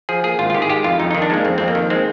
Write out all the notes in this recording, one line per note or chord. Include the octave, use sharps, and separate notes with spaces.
F3 G#4
A#3 G#4
G#1 F4
F4
D#3 G4
G#4
G#3 G4
F2 F4
F2 D#4
D#3 D#4
D4
G#3 A#3
F2 C4
F2 C4
A#3
D#3
G#3 C4